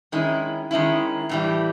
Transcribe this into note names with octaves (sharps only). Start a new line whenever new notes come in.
D#3 G#3 C#4 E4
D#3 G#3 C#4 E4
A2 E3 G3